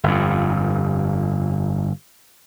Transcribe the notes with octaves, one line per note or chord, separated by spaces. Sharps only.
G1 F2